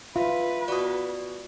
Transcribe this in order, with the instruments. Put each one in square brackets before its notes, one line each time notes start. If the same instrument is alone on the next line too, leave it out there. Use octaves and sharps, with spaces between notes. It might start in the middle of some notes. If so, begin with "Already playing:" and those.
[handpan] F4 [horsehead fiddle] B4 [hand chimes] E5
[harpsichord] B2 F#4 [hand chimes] D5 D#6